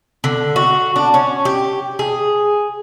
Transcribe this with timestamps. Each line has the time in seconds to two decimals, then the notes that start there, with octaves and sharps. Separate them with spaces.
0.24 D3
0.56 F#4
0.96 D4
1.14 C#4
1.45 G4
1.99 G#4